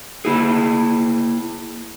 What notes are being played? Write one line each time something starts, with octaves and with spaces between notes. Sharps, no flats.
A#3 E4 G#4